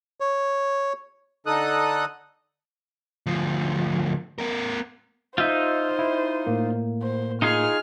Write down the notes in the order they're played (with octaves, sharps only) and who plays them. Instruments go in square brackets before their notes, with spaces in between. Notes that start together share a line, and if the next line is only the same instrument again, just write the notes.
[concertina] C#5
[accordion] D3 D#4 A4 D#5 D#6 F#6
[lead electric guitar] D2 F3
B3 A#4
[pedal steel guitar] D#4 F4 [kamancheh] C5 [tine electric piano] E5 E6 G6
[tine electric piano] E4
A2 A#3
[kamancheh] C5
[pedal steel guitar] D#4 F4 G#4 [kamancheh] F6